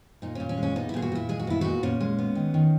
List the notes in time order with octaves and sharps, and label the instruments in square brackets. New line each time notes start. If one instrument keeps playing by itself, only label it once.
[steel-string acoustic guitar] A#2 D#4
A#2 C#4
C#4
G#3
C#4
B3 D#4
E4
A#2 G#4
F#4
A#2 E4
G#3 G#4
F#4
B3 E4
A#2 F#4
A#2 C#4
G#3
B3
D#3
D#3